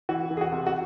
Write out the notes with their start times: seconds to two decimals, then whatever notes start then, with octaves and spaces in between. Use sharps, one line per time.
0.09 E3 F#4
0.31 E3
0.37 G#4
0.41 F#4
0.52 C3
0.67 F#4